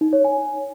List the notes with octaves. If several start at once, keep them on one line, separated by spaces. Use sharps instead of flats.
D#4
C#5
G#5